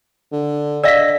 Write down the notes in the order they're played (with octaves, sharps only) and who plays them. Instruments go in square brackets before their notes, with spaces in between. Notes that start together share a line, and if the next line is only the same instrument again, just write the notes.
[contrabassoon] D3
[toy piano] D5 D#5 F5 [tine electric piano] E6 A#6 B6